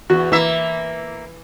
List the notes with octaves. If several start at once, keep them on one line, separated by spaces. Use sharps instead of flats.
E2 F#4
E3 A#3 E5